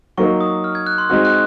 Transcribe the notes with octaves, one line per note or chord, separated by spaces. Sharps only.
F#3 A#3 D#4 C#6
D#6
F6
G#6
F#6
C6
G#3 C4 D#4 F#4 F#6
F#6